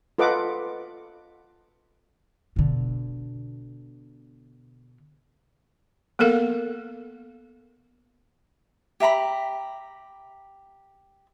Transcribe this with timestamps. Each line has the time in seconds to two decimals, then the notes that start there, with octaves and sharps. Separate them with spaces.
0.18 F4 A4 B4 D#5 F#5 D6
2.56 B2 D3
6.19 A#3 B3 A4 A#4 F5
9.00 G4 E5 A#5 B5